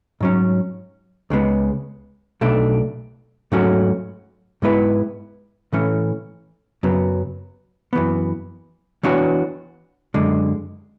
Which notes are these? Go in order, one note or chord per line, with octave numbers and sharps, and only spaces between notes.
G#2 F#3 C#4
C#2 C#3 G#3 B3
B1 B2 A3 D4
G#2 F#3 A3 C#4 F#4
G#2 G#3 B3 E4 B4
A2 E3 A3 C#4
F#2 C#3 F#3 B3
F#2 E3 B3
E3 B3 D4 F#4 C#5
F#2 D3 G#3